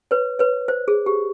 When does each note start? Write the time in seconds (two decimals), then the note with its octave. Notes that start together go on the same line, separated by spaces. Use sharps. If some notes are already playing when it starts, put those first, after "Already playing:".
0.11 B4 C#5
0.39 B4 C#5
0.68 C5
0.88 G#4
1.06 G4